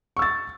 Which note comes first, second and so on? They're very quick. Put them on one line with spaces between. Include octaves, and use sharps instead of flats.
C#6 E6 A6